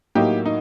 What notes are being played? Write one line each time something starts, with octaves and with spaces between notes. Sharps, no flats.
A2 F#3 A#3 D#4 G4
D#4